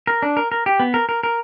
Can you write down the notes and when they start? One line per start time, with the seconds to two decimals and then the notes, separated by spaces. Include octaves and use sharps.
0.07 A#4
0.22 D4
0.37 A#4
0.52 A#4
0.66 G4
0.80 B3
0.94 A#4
1.09 A#4
1.23 A#4